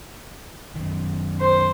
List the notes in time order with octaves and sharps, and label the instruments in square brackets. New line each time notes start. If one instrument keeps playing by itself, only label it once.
[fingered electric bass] F#2 D#3
[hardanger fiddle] C5